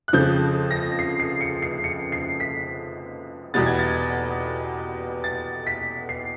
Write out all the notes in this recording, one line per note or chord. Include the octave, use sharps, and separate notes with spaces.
F#6
F2 C#3 F3 G6
A#6
C7
C7
C#7
C7
C#7
C7
B6
E2 B2 G3 B3 A6
G#6
A6
A6
B6
C7